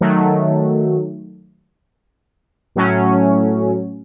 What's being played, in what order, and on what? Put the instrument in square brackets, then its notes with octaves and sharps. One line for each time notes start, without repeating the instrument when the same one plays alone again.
[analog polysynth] D#3 F#3 A3
A2 F#3 A3 C#4